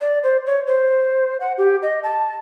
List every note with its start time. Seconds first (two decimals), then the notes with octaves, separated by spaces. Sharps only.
0.01 D5
0.23 C5
0.46 C#5
0.67 C5
1.40 F#5
1.58 G4
1.82 D#5
2.03 A5